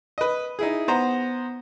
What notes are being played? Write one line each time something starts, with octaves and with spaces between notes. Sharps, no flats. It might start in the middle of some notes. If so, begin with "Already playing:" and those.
B4 D#5
D#4 E4 G#4
B3 C5 A#5